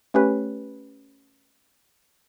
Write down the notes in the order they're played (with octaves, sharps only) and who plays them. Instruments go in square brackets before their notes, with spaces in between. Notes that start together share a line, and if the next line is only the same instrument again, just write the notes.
[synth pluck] A3 C#4 G4 B4